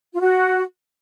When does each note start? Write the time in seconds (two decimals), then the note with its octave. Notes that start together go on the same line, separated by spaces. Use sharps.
0.14 F4
0.20 F#4